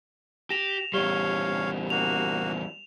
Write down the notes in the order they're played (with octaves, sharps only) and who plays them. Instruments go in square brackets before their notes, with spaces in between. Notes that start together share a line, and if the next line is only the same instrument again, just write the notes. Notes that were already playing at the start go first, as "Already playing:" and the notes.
[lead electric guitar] G4 [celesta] A#6 [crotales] E7 F7
[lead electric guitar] E2 G3 [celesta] G4 G7 [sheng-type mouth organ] C#5 F5
[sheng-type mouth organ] A#3 F#4 [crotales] F7